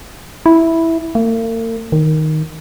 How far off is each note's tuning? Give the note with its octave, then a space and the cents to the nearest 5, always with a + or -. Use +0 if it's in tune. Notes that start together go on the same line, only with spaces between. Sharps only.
E4 -5
A#3 -45
D#3 +0